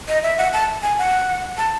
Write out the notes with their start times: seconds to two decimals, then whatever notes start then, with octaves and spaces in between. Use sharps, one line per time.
0.08 D#5
0.23 E5
0.38 F#5
0.53 A5
0.82 G#5
0.98 F#5
1.57 A5